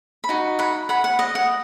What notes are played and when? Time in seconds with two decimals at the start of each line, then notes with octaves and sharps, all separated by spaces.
0.24 B5
0.29 D#4 F#4
0.59 F#5 B5
0.89 F#5 B5
1.04 F#5
1.19 D#5
1.35 F#5